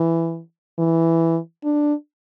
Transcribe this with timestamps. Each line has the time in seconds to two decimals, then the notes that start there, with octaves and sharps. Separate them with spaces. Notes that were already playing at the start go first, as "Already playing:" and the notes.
Already playing: E3
0.79 E3
1.64 D4